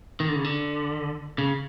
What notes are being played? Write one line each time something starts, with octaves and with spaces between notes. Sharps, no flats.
D#3
D3
C#3
D3
C#3